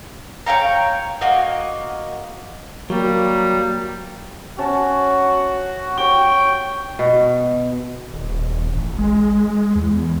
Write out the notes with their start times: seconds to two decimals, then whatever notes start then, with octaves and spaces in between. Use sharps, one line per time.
0.46 C#5 F5 G5 A#5
1.21 A#3 F#4 D#5
2.90 F#3 G3 A#3
4.58 C#4 F#4 A5 E6
5.98 G4 C#5 G5 C#6
6.99 B2
8.14 D#1
8.73 A1
8.98 G#3
9.76 E2